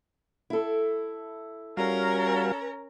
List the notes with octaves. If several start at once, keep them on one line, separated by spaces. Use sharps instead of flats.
E4 A4
G3 C#4 F#4 A#4 F5 A#5